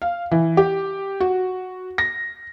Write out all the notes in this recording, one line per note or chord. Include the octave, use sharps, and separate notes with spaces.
F5
E3
G4
F#4
A#6